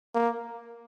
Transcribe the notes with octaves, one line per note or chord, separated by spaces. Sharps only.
A#3